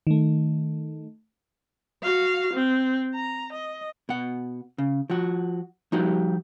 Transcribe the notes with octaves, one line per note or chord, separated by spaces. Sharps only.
D#3 A3
F#4 F5
C4
A#5
D#5
B2 F#5
C#3
F3 F#4
F3 G3 D#4 F#4 G4